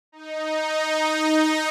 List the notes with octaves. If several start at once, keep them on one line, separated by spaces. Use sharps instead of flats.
D#4
D#4